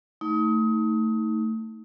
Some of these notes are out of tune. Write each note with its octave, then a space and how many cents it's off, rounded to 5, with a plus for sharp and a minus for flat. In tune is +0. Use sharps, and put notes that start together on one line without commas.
A3 +25 D#4 +30